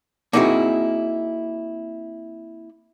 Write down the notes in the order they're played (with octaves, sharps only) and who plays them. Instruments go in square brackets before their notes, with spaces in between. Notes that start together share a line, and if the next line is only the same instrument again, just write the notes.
[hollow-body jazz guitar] A#3 C4 D#4 E4 F#4 G#4